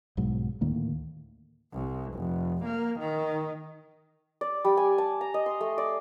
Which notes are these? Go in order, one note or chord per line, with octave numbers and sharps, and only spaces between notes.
B1 G#2 F#3
D2 A2 D#3 A#3
C2
F1
A#3
D#3
D5
G3
G#5
A5
A#5
D#5
C6
A3
D5